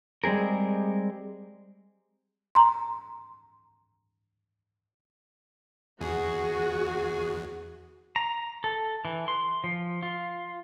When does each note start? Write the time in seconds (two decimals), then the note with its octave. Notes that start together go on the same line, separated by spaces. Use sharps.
0.24 G3 G#3 C4 G#4 A#4
2.55 A#5 C6
6.01 E2 F#4 G#4
8.16 A#5
8.64 A4
9.05 E3
9.28 C6
9.64 F3
10.03 F4